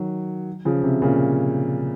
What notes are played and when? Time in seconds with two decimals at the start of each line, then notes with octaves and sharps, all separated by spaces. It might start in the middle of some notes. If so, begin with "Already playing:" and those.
Already playing: D#3 F#3
0.65 C#3 F3
0.83 C3
1.02 A#2 C#3